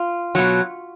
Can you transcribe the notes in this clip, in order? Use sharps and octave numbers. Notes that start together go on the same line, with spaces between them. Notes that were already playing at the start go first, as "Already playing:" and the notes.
Already playing: F4
B2 F#3